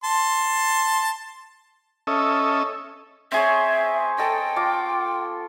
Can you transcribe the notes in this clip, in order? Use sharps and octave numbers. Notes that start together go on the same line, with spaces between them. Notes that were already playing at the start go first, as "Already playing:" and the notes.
A5 C6
C#4 A4 D#5 E5
C4 G#4 C#5 E5
A4 D#5 G5
F4 D6